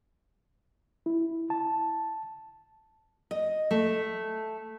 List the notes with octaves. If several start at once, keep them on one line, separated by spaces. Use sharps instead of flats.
E4
A5
D#5
A3